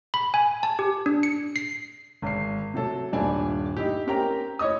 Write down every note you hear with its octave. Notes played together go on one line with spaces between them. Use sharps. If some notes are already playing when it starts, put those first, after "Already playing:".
B5
G#5
A5
G4
D4
C#7
C7
G#1 C7
C3 F#3 A4
D#1 G2 D4 G#5
D#4 E4 G4
C4 C#4 G4 A#4 G5 A#5
E4 C#5 D#5 D#6